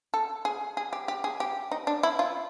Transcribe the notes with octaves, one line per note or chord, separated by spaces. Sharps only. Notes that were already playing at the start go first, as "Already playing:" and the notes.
A4
G#4
G#4
G4
G4
G#4
G4
D#4
D4
E4
F4